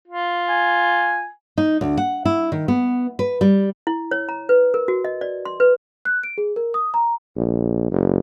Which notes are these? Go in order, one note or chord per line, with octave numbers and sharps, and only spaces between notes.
F4
G#5
D#4
D2
F#5
E4
D#3
B3
B4
G3
E4
C#5
A#5
B4
A#4
F#4
D#5
D5
C6
B4
F#6
D7
G#4
A#4
D#6
A#5
A#1
F#1